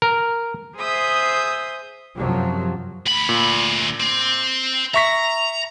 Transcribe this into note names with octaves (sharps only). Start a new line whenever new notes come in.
A#4
G#4 C5 E5 D#6 E6 G6
F#2 C3 F3 F#3
D2 B5
A#2
C4
E5 A#5 C#6 B6